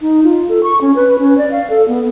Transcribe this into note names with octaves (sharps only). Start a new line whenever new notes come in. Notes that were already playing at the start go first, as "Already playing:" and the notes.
D#4
F4
A4
C#6
C#4
B4
C#4
D5
F5
A4
B3